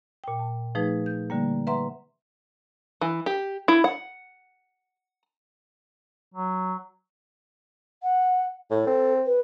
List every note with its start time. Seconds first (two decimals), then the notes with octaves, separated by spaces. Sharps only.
0.24 A#2 G5
0.39 A5
0.75 F3 A3 D#4 G#4 B4
1.06 G6
1.30 D3 G3 A#3
1.67 B4 E5 F#5 A#5 C6
3.01 E3
3.26 G4
3.68 E4
3.84 F#5
6.34 F#3
8.02 F#5
8.71 A2 A4
8.87 C4
9.26 B4